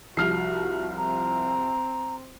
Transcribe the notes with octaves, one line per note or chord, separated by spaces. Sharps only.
C2 F3 F#4 F6 C7
C4 A#5